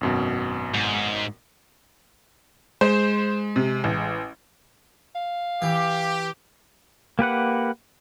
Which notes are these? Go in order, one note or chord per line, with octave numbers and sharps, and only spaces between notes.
G#1 F#2 B2
G#2
G#3 C5
C3
A1
F5
E3 G4
A#3 G4 B4 F#5